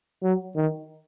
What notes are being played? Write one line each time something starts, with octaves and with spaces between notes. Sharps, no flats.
F#3
D#3